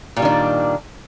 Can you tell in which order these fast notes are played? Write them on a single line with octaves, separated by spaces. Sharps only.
A#2 G3 D#3 D4